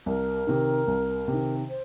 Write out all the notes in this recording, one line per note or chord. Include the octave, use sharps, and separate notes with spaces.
C2 A#4
C3 D#3
C2
C3
D#3
C5